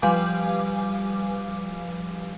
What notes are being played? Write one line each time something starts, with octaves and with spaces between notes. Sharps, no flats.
F3 G3 B4 F5 G#5 D6